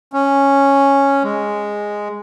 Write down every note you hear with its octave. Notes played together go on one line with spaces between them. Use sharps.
C#4
G#3